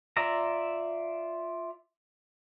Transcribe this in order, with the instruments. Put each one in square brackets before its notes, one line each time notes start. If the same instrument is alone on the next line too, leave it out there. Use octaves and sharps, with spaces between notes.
[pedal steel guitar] F4 D5 E5 A#5